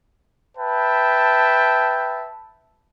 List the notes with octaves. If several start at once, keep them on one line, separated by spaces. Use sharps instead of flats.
B4 E5 G5 A5